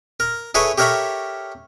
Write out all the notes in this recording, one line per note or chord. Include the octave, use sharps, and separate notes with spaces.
A#4
E4 G#4 A4 B4 C#5
G4 A4 A#4 C#5 E5 B5